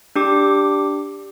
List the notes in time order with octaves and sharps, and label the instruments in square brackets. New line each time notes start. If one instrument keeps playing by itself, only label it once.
[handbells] D4 G4 D6